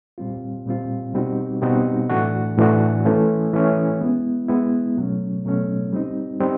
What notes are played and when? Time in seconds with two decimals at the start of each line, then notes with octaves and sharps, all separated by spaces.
0.18 A#2 G3 C4 F4
0.66 A#2 G3 C4 F4
1.14 B2 G3 C4 D#4 F#4
1.62 B2 G3 C4 D#4 F#4
2.09 A2 E3 A3 D4 F#4
2.57 A2 E3 A3 D4 F#4
3.05 E3 A3 C#4
3.53 E3 A3 C#4
4.01 G#3 B3 E4
4.49 G#3 B3 E4
4.97 B2 F#3 A3 C#4
5.44 B2 F#3 A3 C#4
5.93 G3 C4 D#4
6.40 G3 C4 D#4